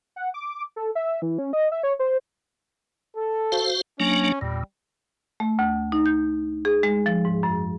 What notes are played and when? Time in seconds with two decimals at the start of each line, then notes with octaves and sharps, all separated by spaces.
0.16 F#5
0.34 D6
0.76 A4
0.95 E5
1.22 E3
1.39 C#4
1.53 D#5
1.72 E5
1.83 C#5
1.99 C5
3.17 A4
3.52 F#4 C5 F5
4.00 F#3 A#3 C#4 D4
4.41 E2 A#2 G3
5.40 A3
5.59 D2
5.92 D#4
6.06 G6
6.65 G#4
6.83 G#3
7.06 F3
7.25 G#2
7.43 F#2